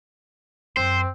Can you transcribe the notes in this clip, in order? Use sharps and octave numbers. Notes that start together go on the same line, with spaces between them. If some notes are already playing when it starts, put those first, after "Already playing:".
F#2 C4 C5